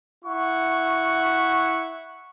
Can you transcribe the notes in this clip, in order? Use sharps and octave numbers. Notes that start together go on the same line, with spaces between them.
E4 F#5 C#6